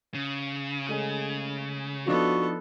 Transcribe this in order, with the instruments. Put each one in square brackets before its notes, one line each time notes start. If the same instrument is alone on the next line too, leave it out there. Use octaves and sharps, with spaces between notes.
[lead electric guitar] C#3
[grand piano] G#3 A3 D#7
[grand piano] F3 D4 D#4 [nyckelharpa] B3 A4 [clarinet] F#4